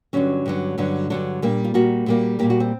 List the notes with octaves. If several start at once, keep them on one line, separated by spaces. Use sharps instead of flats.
G2 D3 F#3 C#4
G2 D3 F#3
G2 D3 F#3
G2 D3 F#3 D4
A#2 G3 A#3
F4
A#2 G3 A#3 F#4
A#2 G3 A#3
A#2 G3 A#3 G4
F#4
C4